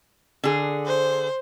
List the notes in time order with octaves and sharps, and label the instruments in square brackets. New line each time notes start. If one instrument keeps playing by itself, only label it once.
[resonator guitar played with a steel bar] D3 G#4
[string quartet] C5